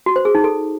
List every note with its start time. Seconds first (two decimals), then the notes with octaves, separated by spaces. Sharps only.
0.06 F#4
0.16 C5
0.25 G#4
0.35 D#4
0.44 A4